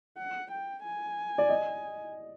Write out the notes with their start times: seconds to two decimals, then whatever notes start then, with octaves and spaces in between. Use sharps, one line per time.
0.18 F#5
0.51 G5
0.84 G#5
1.38 D5
1.49 D#5